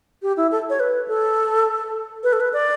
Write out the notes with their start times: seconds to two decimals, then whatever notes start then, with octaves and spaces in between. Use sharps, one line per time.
0.22 G4
0.37 E4
0.51 A4
0.70 C#5
0.80 B4
1.08 A4
2.24 B4
2.33 A4
2.40 B4
2.53 D5